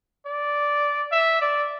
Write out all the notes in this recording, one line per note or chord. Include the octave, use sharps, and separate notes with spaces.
D5
E5
D5